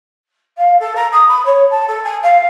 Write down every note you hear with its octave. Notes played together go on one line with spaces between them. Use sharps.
F5
A4
A#5
D#6
B5
C#5
A5
A4
G#5
F5